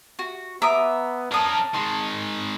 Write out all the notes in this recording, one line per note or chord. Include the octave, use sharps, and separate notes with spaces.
F#4
B3 E5 A#5 D6 D#6
C#4 D4 A#4 A5 D#6
D#3 G#3 C6